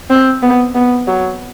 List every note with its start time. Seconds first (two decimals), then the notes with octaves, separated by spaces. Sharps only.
0.10 C4
0.42 B3
0.75 B3
1.07 F#3